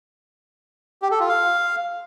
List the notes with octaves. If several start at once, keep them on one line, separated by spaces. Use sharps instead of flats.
G4
A4
F4
F5